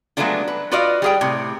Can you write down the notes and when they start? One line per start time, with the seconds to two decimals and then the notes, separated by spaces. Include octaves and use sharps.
0.17 F#3 G#3 A3 B3 D4 F4
0.48 B4
0.71 F4 F#4 B4 D5 D#5 F5
1.02 G3 G#4 G5
1.21 A2 C3